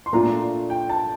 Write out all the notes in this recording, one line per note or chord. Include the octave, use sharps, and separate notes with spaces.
C6
A#2 A3 D4 F4 A#5
G5
A5